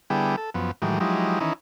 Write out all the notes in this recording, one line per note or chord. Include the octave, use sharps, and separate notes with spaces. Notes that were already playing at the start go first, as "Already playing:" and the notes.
D3 G3 B3 E4 G#4 G5
A4
F#2 F3 B3
A2 D#3 E3 F#3 G#3 G4
F3 F#3 G#3 D#4 E4 G4
D#3 E3 C#4 D#4 E4